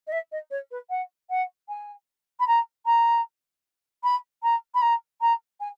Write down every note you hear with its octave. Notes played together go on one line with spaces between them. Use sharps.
D#5
E5
D#5
C#5
B4
F#5
F#5
G#5
B5
A#5
A#5
B5
A#5
B5
A#5
A#5
G#5